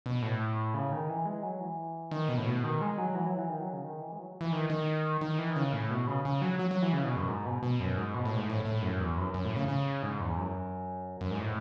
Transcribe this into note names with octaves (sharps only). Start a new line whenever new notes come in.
B2
A2
C#3
D#3
E3
G#3
F#3
E3
D#3
B2
A2
B2
D#3
G#3
F#3
E3
F#3
E3
D#3
F#3
C#3
D#3
E3
G#3
F#3
E3
D#3
D#3
D#3
E3
D#3
C#3
A2
B2
C#3
C#3
F#3
F#3
F#3
E3
C#3
B2
F#2
G#2
B2
B2
F#2
G#2
B2
A2
G#2
A2
A2
F#2
E2
F#2
F#2
A2
C#3
C#3
G#2
E2
F#2
F#2
G#2
A2